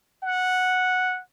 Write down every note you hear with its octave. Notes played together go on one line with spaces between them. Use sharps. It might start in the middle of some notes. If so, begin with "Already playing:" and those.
F#5